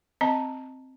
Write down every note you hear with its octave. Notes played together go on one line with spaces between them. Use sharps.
C4 D#5 A5 A#5